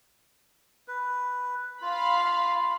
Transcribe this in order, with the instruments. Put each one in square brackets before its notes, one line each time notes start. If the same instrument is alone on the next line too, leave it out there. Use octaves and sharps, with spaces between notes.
[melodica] B4
[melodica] F4 [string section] F5 B5